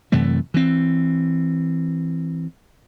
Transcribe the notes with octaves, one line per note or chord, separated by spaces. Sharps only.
F#2 C3 E3 A3
E3 C4